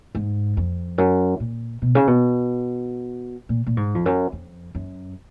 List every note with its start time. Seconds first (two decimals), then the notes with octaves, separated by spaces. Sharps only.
0.15 G#2
0.57 F2
0.98 F#2
1.40 A#2
1.82 B2
1.95 C#3
2.07 B2
3.49 A#2
3.67 A#2
3.77 G#2
3.95 F2
4.06 F#2
4.32 F2
4.75 F#2